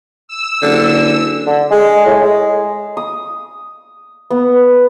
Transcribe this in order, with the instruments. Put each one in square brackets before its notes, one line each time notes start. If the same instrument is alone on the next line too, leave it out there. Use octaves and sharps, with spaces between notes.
[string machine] E6
[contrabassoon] F#1 [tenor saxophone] D3
[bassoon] D3
G#3
A2
G#3
[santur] D#6
B3